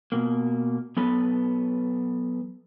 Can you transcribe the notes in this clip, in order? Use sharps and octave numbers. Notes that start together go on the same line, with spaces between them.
B2 A#3
F#3 B3 A4 B4